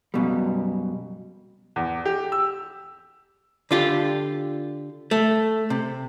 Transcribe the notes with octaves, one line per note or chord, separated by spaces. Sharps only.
F#2 B2 G3
E2
G4
E6
D3 F4 G4
A3
C3